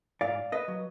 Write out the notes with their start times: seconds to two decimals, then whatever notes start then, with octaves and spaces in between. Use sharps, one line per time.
0.21 G#2 D5 F5
0.52 B4 D#5
0.68 F#3